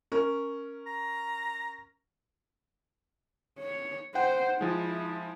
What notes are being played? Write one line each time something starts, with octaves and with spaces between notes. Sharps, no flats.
C#4 A#4
A#5
C#5
C5 F#5 G5
F3 G#3 E4